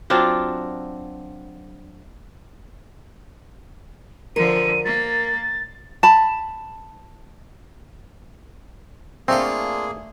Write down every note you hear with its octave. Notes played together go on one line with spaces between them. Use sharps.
F#3 C4 D4 F4
D3 F3 A#4 D#7
A#3 A6
A5 B5
A3 A#3 C4 D4 F4 G#4 C#5